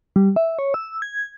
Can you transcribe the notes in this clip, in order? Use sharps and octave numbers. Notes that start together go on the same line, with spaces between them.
G3
E5
C#5
E6
G#6